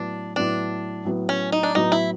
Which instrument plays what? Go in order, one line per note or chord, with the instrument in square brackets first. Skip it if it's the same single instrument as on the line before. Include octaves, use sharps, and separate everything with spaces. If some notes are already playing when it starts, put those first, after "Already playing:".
Already playing: [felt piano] A2 F#3 B3 [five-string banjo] D4
[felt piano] A2 F#3 B3 [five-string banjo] D4
[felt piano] A2 F#3 B3
[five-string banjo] C#4
D#4
D4
[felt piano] A2 F#3 B3 [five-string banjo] D#4
[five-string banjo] E4